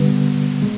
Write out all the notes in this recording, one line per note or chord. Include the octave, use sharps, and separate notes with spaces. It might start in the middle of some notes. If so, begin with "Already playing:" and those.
Already playing: D3 G3 B3
G#3